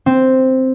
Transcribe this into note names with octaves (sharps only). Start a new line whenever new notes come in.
C4